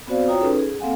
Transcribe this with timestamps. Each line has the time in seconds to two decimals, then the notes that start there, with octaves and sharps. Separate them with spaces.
0.07 B3 C4 F#4 C5 D5 F5
0.28 F4 F#4 C#5 G5 A#5 D#6
0.41 C#4 D#4 G#4 A4 B4
0.59 G#4
0.80 A#3 C4 A4 F5 F#5 G#5